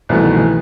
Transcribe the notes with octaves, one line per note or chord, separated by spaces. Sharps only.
C2 B2 E3 A3
D#3
E3